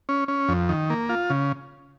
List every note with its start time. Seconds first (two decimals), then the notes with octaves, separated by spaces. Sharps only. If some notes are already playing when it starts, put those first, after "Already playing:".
0.09 C#4
0.28 C#4
0.49 F2
0.69 D#3
0.90 A#3
1.09 F4
1.30 C#3